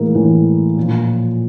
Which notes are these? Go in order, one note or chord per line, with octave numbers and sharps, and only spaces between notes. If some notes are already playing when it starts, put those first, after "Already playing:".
Already playing: A2 E3 G#3 A#3
A2 E3
A#2 F3